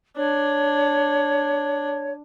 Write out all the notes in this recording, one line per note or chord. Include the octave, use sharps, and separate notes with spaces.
D4 C#5